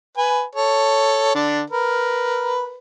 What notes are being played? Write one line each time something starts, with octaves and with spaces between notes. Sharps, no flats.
B4 G#5
A4 C#5
D3 D4
A#4 B4